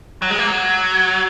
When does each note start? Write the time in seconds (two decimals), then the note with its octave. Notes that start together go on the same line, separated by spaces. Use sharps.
0.22 F#3
0.31 G#3
0.39 A#3
0.47 F#3